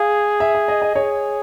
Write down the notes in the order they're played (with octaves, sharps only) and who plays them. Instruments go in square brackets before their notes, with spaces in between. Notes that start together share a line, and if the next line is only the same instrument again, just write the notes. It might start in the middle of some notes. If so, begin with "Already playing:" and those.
Already playing: [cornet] G#4 [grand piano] F5
[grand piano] E5
E5
D#5
D#5
[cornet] G#4 [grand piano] C#5